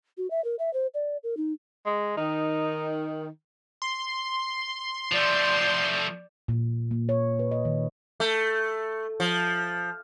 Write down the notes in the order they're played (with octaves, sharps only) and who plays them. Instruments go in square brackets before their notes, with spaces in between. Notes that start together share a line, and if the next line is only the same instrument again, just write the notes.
[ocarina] F#4
E5
A#4
E5
C5
D5
A#4
D#4
[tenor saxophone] G#3
[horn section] D#3 [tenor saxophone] D#4
[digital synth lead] C6
[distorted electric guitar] F3 A3 [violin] D5 G6
[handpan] A#2
A#3
C#5
B4
D#5
D#3
[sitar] A3
F3